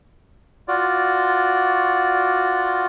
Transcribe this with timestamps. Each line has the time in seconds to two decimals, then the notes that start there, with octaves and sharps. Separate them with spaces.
0.68 F4 F#4 D5